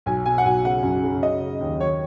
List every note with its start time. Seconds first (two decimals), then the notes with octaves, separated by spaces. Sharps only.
0.06 B1 G#5
0.26 B2 G#5
0.38 F#5
0.45 B1 G#5
0.65 C#3 F#5
0.83 F#2
1.03 C#3
1.23 C#3 D#5
1.42 C#3
1.61 D#2
1.80 D#3 C#5